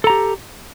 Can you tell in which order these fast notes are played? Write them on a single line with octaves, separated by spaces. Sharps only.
A4 A#5 G4